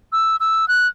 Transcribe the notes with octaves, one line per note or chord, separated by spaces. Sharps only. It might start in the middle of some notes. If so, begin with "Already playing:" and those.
E6
E6
F#6